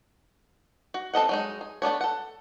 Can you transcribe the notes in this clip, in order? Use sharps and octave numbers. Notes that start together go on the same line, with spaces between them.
F#4
C4 A4 D#5 F#5
F#3 G#3 D#4
G#4
A3 B3 D4 C#5
A4 F#5